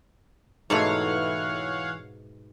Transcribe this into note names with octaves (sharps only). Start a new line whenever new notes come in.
G#2 B2 E3 A3 C#5 F5 F#5